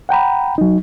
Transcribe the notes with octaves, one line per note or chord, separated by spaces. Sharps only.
F#5 G5 A#5 B5
F#3 D#4